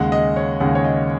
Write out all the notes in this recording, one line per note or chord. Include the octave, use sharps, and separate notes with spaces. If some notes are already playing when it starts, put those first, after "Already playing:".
Already playing: D#2 C#3 G#3 F#5
D#5
C#5
D#2 C#3 G#3 F#5
C#5
D#5